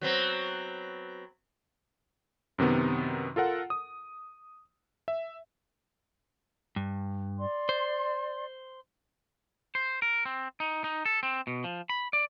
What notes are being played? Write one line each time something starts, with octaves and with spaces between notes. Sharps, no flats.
F#3 B3 C4
F#2 C3 D#3 B3
F4 A4 A#4 F#5
D#6
E5
G2
D5 C6
C5
C5
A#4
C4
D#4
D#4
A4
C4
B2
F3
B5
D5